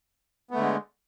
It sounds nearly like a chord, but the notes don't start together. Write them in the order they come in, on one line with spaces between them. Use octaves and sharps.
B3 A3 D3 G#3